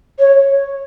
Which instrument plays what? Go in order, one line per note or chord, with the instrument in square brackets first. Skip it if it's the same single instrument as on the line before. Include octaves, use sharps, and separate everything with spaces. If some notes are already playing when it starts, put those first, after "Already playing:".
[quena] C#5